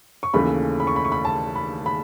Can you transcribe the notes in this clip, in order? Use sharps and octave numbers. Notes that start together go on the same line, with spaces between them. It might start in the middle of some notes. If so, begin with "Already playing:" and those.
C#6
D#2 C#3 E3 A3 B5
B5
C#6
B5
C#6
B5
A5
B5
B5